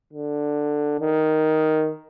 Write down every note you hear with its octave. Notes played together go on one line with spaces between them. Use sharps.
D3
D#3